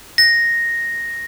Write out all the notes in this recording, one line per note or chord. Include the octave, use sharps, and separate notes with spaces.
A#6